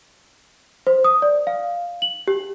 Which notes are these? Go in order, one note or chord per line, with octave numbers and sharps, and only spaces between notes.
C5
D#6
D5
F5
F#7
G4